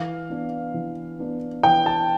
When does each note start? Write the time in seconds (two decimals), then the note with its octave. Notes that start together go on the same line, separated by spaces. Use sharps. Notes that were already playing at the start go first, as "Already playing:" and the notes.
Already playing: E3 F5
0.30 B3 D4
0.74 E3
1.19 B3 D4
1.63 E3 G5
1.86 A5